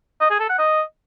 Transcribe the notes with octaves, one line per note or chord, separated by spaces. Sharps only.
D#5
G#4
A4
F#5
D#5